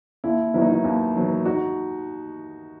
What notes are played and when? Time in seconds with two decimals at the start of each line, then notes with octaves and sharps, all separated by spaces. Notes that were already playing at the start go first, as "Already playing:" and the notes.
0.24 D#2 E4
0.54 D#3 F#3 B3 E4
0.62 D#4
0.70 E4
0.84 D#2
1.15 D#3 F#3 B3
1.45 D#4 F#4